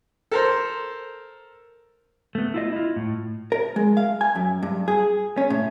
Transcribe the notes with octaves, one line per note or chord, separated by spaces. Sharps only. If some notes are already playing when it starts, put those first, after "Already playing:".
A4 A#4 C5
A3 B3
E4 F4 D#5
E4 F4
A2
A#4
G#3
F5
G#5
F#2
G2
G#4
C#4
A2